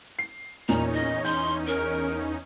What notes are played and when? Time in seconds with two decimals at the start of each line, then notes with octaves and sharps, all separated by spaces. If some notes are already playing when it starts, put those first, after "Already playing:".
0.19 C7
0.69 E2 A#2 A#3 C#4 D#4 A#5
0.94 D#5
1.25 C6 G6
1.67 A#4